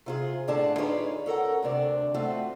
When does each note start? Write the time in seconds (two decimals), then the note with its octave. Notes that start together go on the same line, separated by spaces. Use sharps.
0.06 C3 F4 G#4
0.48 A2 D3 D4 G#4 A5
0.78 D#4 F4 G#4 B4 C#5 D5
1.26 C#4 A4 A#4 F#5
1.63 D2 C3 D4 D5
2.14 A3 C4 F4 F#4